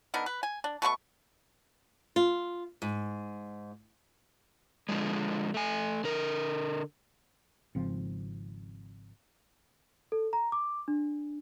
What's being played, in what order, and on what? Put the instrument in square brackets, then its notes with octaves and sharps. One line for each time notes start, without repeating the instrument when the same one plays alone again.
[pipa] D3 B3 D#4 A#4
B4
G#5
D4
B2 A3 C4 C#6
[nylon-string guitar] F4
G#2
[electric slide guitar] D3 F3 G#3
A3 G#5
D3 A#4
[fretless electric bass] G#1 C#3 F3 C4
[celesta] A4
A#5
D6
D4